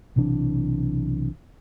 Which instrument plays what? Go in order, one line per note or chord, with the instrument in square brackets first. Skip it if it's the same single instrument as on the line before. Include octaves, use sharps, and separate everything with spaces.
[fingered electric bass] B1 C3 E3 D4